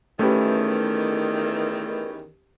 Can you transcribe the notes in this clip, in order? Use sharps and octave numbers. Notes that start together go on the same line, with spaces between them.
E2 D#3 A3 C#4 G4 B4